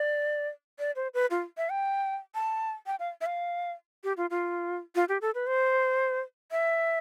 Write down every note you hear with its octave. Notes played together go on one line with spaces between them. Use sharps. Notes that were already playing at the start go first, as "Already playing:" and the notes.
Already playing: D5
D5
C5
B4
F4
E5
G5
A5
G5
F5
E5
F5
G4
F4
F4
F4
G4
A4
B4
C5
E5